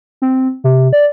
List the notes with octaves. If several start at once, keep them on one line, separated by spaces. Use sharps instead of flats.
C4
C3
D5